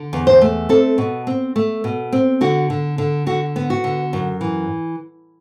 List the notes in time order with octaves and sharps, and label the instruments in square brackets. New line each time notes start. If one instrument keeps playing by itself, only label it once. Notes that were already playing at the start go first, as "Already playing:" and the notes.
Already playing: [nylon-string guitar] D3
E2
C5
A3
C4 A4
B2
C4
A3
B2
C4
D3 F#4
D3
D3
D3 F#4
B3
F#4
D3
F#2
E3